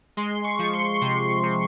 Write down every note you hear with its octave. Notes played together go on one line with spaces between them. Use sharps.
G#3 C6
C#6
F3
C6
C3
C3